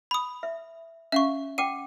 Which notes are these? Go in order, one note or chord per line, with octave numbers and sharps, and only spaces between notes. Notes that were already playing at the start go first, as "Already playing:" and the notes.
B5 D#6
E5
C#4 E5 F5 C#6
F#5 G5 D6 D#7